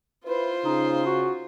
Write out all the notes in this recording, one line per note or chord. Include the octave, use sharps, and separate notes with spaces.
E4 F4 B4 C5
C#3 D#4
F#4